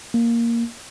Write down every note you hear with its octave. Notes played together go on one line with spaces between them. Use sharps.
A#3